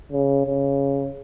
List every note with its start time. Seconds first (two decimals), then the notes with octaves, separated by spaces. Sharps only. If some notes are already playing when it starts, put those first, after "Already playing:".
0.12 C#3
0.47 C#3